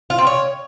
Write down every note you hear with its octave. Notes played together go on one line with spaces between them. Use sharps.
F4
C4
C#5